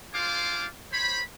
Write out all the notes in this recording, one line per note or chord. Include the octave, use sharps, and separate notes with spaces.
D4 F4 G#4 C5 F5 D6
C5 C#5 B5